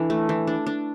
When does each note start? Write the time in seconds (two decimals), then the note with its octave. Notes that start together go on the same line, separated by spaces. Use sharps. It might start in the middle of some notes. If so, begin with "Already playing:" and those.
Already playing: E3 D4 A4
0.10 A3
0.29 E3
0.47 D4
0.67 D4